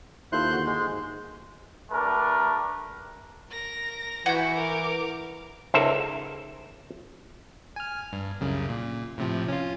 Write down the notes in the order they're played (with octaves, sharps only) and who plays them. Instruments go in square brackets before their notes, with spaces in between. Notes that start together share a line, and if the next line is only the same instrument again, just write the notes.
[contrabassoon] D#2 [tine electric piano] E4 F4 A4 [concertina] C5 C6 F#6
[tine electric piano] D3 F#4 G6
[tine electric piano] G#2 [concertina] G#3
[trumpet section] A3 D4 G4 A#4 B4
[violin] A#4 A#6
[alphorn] E3 [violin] E4 F#4 [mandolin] F#5 G6
[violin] A#4 D6
[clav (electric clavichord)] C#2 G#2 A4 A#4 C5 E5
[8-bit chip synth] G#5 F6
G2
C2 F#2 C#3
A#2
A2 C3 F3
C#4 F4